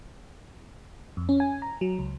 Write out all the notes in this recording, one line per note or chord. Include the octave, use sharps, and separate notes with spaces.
F2
C#4
G#5
A#5
F#3
C#2